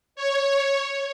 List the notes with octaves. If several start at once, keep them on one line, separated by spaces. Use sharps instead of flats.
C#5